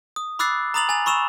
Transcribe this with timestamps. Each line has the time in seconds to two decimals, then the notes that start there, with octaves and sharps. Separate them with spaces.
0.16 D#6
0.39 B5 D6 E6 F#6 A6 C7
0.74 A#5 B5 D#6 A6 F7 F#7
0.89 G#5 A6 F7
1.06 B5 C#6 E6 E7 F7